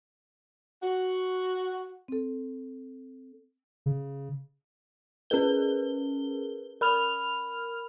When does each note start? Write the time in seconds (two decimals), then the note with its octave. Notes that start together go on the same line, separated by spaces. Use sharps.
0.83 F#4
2.08 C4 A4
3.86 C#3
5.30 C#4 G#4 A#4 B4 G7
6.81 A#4 B5 F6 F7